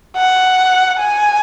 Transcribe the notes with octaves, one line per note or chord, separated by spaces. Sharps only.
F#5
G#5